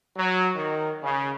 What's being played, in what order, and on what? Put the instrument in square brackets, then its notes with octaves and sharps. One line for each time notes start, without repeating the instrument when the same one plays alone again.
[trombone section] F#3
D#3
C#3